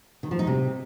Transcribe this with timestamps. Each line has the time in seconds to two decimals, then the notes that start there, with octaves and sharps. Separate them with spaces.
0.23 D#3
0.31 F3
0.39 D#4
0.47 C3